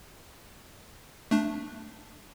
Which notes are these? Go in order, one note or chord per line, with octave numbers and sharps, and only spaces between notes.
A3 D4